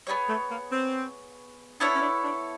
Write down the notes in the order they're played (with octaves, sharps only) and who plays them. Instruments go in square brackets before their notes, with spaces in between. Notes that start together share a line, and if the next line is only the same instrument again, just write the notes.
[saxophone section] G3 [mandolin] B3 D#4 G#4 C#5
[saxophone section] A3
A#3
C4
[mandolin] B3 E4 A4 C#5 [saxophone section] D4
[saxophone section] C#4
D4
D4